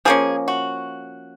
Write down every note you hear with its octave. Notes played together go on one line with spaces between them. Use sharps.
F3 A#3 C#4 G#4
F#4